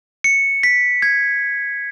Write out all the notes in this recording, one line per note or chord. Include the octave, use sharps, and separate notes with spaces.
C#7
B6
G#6